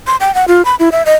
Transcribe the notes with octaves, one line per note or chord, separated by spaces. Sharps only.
C6
G5
F#5
F4
B5
E4
E5
D#5